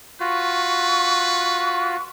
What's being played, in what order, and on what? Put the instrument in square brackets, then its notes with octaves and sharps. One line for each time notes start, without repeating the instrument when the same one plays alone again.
[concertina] F4 F#4 [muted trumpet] B4 [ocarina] C#6